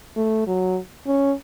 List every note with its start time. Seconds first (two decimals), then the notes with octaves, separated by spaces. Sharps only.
0.17 A3
0.47 F#3
1.07 C#4